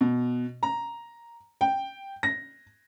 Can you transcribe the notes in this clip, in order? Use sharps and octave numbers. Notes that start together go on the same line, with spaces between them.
B2
A#5
G5
A#6